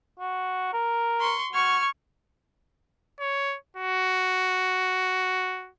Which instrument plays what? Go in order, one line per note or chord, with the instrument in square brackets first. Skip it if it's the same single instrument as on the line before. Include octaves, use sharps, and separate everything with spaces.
[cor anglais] F#4
A#4
[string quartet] C6 C#6
[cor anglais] F#4 [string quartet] C#6 F6 G#6
[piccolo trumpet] C#5
F#4